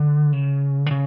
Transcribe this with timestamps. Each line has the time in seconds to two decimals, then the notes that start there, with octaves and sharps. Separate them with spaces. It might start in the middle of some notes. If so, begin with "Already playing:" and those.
Already playing: D3
0.33 C#3
0.86 D3
0.91 C#3